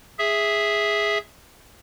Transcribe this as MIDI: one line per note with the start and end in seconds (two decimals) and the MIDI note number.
0.19 1.18 68
0.19 1.18 76